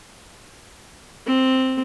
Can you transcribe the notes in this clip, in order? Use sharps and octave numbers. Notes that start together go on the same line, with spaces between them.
C4